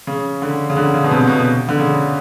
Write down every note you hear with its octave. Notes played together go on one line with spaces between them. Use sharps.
C#3
D3
C#3
D3
C#3
B2
C3
B2
D3
C#3